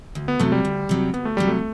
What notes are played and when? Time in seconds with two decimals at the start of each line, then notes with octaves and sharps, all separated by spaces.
0.15 D2
0.28 B3
0.40 C3 F#3 A3
0.52 G3
0.65 D2
0.89 C3 F#3
1.14 D2 B3
1.25 A3
1.37 C3 F#3 G3
1.48 A3